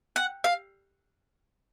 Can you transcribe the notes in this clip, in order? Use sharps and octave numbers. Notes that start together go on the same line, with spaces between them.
F#5
F5